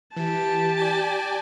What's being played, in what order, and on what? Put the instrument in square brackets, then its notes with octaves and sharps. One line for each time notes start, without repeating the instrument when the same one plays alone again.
[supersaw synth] E3 [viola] G4 A5
[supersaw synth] D5 G5 G#5